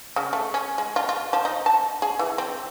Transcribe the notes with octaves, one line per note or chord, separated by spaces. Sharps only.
C#3
A3
C#4
G#3
F4
F4
F3
D#4
A5
G#4
E3
C4